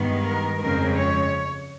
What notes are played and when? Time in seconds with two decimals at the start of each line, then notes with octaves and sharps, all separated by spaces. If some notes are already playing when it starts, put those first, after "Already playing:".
Already playing: G2 D#3 G#3 B3
0.25 A#4
0.61 F2 C#3 F3 G#3 C4 A#4
0.97 C#5